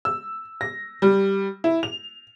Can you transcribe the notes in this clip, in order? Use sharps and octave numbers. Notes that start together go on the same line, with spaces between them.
E6
A#6
G3
E4
F7